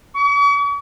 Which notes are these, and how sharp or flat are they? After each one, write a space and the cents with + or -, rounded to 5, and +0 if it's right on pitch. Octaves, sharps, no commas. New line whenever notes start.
C#6 +45